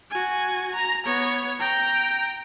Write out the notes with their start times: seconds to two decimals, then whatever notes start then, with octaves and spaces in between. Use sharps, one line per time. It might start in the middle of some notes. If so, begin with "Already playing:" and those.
0.11 F#4 G#5
0.75 A#5
1.05 B3 C#5
1.60 G5 A#5